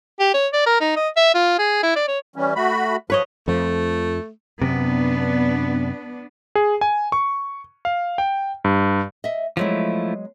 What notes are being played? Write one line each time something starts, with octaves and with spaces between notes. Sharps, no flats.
G4
C#5
D5
A#4
D#4
D#5
E5
F4
G#4
E4
D5
C#5
E3 G3 C#4
A3 F#4 B5
F3 B4 C#5 D#5
F2 F3 A3
F#2 C3 B3 D4
G#4
G#5
C#6
F5
G5
G2
D#5 E5
F3 F#3 G#3 A3 B3 E4